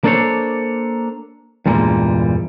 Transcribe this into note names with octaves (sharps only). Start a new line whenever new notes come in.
A#3 D4 A4 C5 C#5
E2 G2 A#2 G3 G#3 A#3